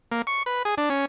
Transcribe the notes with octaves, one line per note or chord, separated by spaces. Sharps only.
A#3
C#6
B4
G#4
D4
C#4